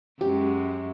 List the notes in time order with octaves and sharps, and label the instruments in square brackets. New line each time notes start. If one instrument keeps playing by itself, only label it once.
[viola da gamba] F#2 G#3 [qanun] G4